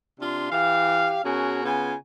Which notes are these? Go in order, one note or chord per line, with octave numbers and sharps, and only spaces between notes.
C3 D4 F4 F5 C6
E3 G4 F5
B2 C#4 F#4 G#4 A#4
C#3 B3 F4 G#5